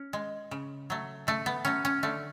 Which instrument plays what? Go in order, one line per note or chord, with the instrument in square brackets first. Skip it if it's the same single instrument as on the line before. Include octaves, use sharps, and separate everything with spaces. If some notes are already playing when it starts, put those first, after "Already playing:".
Already playing: [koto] C#4
G#3
C#3
F#3 A3
C#3 A3
B3
F#3 A3 C#4
C#4
D3 A3